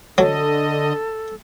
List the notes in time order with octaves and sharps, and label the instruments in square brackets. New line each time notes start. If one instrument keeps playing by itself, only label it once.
[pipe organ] D3 D#5 [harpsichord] F#3 [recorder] A4